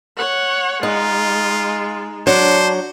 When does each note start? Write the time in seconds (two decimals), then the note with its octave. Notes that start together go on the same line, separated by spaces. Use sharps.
0.17 C#5 F#5
0.83 G#3 D#4 F4
2.27 F#3 D4 C5